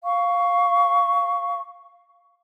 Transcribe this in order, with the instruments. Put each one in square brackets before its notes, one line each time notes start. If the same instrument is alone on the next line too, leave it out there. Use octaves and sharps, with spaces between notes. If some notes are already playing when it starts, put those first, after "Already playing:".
[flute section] F5 C#6